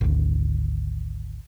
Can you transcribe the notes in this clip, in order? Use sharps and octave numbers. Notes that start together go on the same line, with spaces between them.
G#1 D2